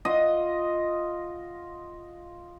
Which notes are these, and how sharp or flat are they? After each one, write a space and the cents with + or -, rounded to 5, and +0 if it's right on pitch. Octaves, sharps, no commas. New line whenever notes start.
F4 +0 D#5 +0 F#5 +0